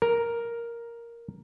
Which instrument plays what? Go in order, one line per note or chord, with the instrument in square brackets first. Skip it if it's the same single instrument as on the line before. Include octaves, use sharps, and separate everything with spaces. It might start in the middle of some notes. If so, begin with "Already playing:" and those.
[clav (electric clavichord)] A#4